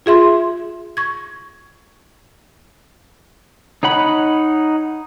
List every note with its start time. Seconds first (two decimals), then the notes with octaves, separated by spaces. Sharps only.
0.06 F4 G#4 E5 C6
0.97 C#6 G#6
3.83 D#4 C#5 F#5 B5